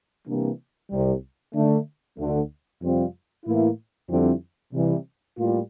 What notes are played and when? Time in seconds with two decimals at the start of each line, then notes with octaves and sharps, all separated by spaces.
0.27 C3 E3 G3 A#3 D4
0.90 C2 C3 G3
1.55 D3 A3 D4
2.18 D2 D3 A3
2.82 F2 C3 G3 C4 F4
3.45 A2 E3 A#3 E4
4.10 F2 D3 G3 C4 E4
4.73 C3 E3 G3
5.37 A2 G3 A#3 F4